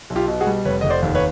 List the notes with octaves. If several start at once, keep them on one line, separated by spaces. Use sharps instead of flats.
B1
F4 G4
B2
F#4 G#4
G3
F1 B4 C#5
F1 D#5
C5 D5
D#2
B4 C#5